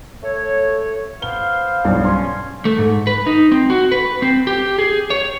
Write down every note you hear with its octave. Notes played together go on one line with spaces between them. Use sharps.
A3 A4 C#5
B3 C5 F5 G7
B1 G2
C#4 C6
A3
G#2
B4
D#4
C4
F#4
B4
C4
G4
G#4
C#5